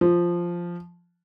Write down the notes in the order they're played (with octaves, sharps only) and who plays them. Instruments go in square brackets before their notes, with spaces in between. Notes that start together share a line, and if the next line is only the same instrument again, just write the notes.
[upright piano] F3